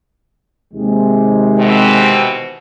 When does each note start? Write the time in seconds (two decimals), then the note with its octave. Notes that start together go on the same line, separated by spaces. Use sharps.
0.74 D#2 C3 G#3
1.58 B2 E3 C4